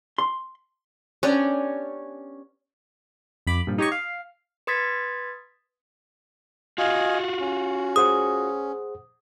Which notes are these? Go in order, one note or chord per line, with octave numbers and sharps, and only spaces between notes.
C6
B3 C#4 D4 G4
F2 B5 D6
G2 A#2 F3
D#4 G4 C#5 D#5 C#6
F5
B4 C6 D#6 G#6 A6 B6
F4 F#4 D#5 F5 G#5
C#4
G#4 C5 F#5 D#6